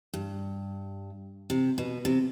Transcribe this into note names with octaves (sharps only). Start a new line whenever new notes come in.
G2
C3
B2
C3